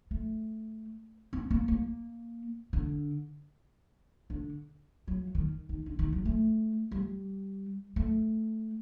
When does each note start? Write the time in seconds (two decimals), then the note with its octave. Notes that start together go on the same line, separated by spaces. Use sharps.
0.11 A3
1.33 C4
1.51 A#3
1.68 A#3
2.73 D3
4.30 D3
5.08 F#3
5.35 D#3
5.69 D#3
5.86 D3
5.99 D#3
6.13 F#3
6.25 A3
6.92 G3
7.96 A3